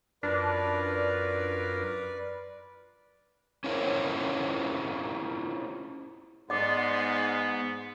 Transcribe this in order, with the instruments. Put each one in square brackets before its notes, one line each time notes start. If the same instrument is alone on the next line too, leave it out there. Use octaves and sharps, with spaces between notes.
[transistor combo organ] F#2 F4 A#4 [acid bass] D4 [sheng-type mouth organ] B4 D5
[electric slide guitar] C#4 E4 F4 A#4 C5 C#5
[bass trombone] G#2 [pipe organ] B3 [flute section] D5 F#5 C6 [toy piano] D#5 D6